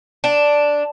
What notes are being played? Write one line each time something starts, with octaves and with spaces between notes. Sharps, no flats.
D4